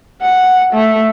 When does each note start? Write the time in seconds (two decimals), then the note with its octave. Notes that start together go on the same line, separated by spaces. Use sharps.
0.21 F#5
0.73 A3